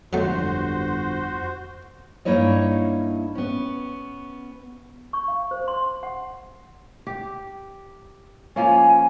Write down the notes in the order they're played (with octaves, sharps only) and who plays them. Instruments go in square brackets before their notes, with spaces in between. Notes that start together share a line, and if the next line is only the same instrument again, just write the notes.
[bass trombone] G1 [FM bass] F2 [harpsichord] F#3 A3 [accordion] F#4 C5
[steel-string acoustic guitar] G2 A#3 D#4 E4 C#5 D#5
B3 C#4
[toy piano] C#6
F5
C5
C6
F#5
[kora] G4
[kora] F3 A#3 C#4 [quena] G#5